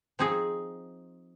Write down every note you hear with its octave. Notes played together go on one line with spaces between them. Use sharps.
F3 C4 D#4 G#4